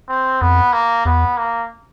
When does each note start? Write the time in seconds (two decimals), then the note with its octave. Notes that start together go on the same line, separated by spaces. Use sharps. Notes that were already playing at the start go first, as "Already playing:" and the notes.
0.09 C4
0.41 F2 B3
0.73 A#3
1.05 E2 B3
1.37 A#3